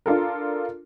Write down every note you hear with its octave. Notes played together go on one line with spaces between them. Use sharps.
D4 F4 A4 A#4